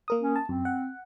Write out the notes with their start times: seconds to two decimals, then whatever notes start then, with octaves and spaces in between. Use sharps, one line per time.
0.08 A#3 A#4 D#6
0.20 C#4
0.36 A5
0.49 F#2 C4
0.65 F#5